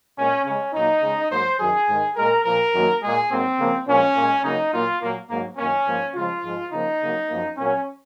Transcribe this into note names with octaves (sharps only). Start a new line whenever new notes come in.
A#2 G#3 C#4
C#3 G#3 C#4
A#2 F#3 A#3 D#4
C#3 G#3
G#2 F#3 A#3 C5
F#2 D#3 F#3 G#4
G#2 D#3 G#3
A#2 G#3 A#4
A#2 F3 A#3 A#4
F#2 D#3 F#3 A#3
A#2 G#3 G#4
G#2 F#3 A#3 C4
C#3 F3 A#3
A#2 F3 G#3 C#4
A#2 G#3
C#3 F#3 A#3 D#4
A#2 F#3 A#3 F4
A#2 F#3 A#3
G#2 F#3 A#3
F#2 D#3 A#3 C#4
G#2 F3 A#3
C#3 F3 G#3 F4
G#2 F3 G#3
C#3 F3 A#3 D#4
C#3 F#3 A#3
F#2 F3 A#3
A#2 F#3 A#3 C#4